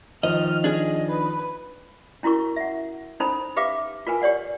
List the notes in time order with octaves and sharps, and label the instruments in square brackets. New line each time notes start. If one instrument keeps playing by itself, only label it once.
[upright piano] D#3 F3 [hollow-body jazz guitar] D#5 [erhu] F6
[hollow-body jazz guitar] D4 G#4 [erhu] D#5
[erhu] B4
[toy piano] C#4 E4 F#4 A#4 C#6
E5 F#5
C#4 D#4 A4 C5 A#5 B5
G4 B4 E5 F5 D6
F4 A#4 B4 G#5
G4 C#5 D5 F#5